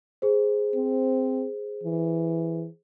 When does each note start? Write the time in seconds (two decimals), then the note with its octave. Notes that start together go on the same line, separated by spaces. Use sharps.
0.22 G#4 C5
0.75 C4
1.84 E3